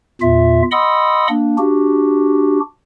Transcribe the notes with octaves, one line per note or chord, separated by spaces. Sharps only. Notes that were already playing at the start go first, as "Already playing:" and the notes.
E2 A#2 F4 E5
D#5 F#5 B5 C6 D#6 E6
A#3 D4
D4 F#4 G4